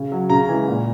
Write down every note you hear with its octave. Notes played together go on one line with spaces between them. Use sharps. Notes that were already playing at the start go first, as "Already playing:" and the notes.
Already playing: C#3
F#3
C#3 A#5
E3 G#3
A#2